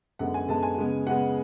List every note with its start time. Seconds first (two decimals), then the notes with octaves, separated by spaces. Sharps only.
0.19 F#2 D3 G#3 B3 F#5
0.34 G#5
0.48 F#2 D3 G#3 B3 A5
0.63 G#5
0.78 C#3 G#3 B3
1.07 C#3 G#3 B3 F#5